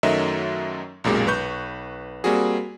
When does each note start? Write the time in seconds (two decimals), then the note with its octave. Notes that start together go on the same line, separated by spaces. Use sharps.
0.03 F#2 D#3 F#3 A3 D#5 E5
1.04 B1 F#2 A#2 G#3 G4
1.27 B1 B4 C#6 G6
2.24 G3 A#3 C4 F#4 G#4